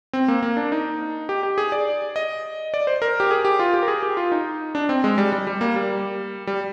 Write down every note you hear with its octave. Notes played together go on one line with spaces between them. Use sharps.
C4
A#3
A#3
D4
D#4
G4
G4
G#4
D5
D#5
D5
C5
A#4
G4
G#4
G4
F4
G4
A#4
G#4
G4
F4
D#4
D4
C4
G#3
G3
G3
G3
A#3
G3
G3